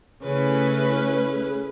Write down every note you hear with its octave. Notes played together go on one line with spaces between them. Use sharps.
C#3 A3 C#4 E4 G#4 B4